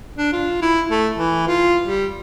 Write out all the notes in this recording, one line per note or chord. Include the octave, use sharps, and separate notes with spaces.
D4
F4
E4
A3
E3
F4
G3